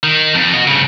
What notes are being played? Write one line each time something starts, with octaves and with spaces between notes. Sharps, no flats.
D#3
F2
F#4 D#5
G2 C#3